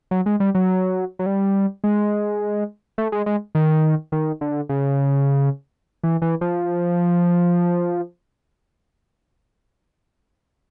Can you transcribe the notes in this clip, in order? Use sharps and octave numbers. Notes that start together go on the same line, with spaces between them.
F#3
G#3
G3
F#3
F#3
G3
G#3
A3
G#3
G#3
D#3
D#3
D3
C#3
E3
E3
F3